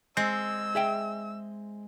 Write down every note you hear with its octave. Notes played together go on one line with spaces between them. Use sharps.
G#3 C4 E6
G#4 E5 G5